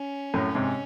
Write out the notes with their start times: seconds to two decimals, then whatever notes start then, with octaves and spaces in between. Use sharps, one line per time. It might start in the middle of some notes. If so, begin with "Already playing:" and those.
Already playing: C#4
0.34 F#2 A2
0.55 G#2 C3